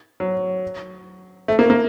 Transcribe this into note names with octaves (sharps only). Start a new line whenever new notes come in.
F#3
A3
A#3
A#3